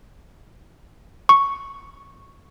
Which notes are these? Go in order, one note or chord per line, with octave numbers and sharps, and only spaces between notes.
C#6